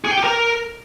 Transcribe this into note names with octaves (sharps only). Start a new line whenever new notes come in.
G#4
G5
G4
A#4